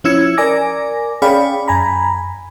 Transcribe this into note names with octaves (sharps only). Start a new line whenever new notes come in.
F3 C#4 E4 E6 G#6 C#7
A#4 D5 G#5 D6 A#6
C#4 G#4 D5 F5 G5 B5
F#2 G#5 A#5 B5